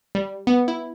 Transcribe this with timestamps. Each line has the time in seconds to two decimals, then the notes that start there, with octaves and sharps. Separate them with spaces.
0.15 G3
0.47 B3
0.68 E4